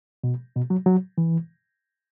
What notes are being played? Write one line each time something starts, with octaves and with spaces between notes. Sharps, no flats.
B2
B2
F#3
F#3
E3